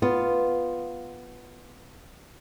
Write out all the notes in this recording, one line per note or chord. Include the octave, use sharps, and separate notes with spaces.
B3 F4